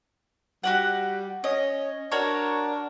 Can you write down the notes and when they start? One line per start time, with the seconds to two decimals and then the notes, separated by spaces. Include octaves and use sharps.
0.64 G3 F#4 G4 F#5
1.44 C#4 D#5
2.12 D4 F#4 A#4 C#5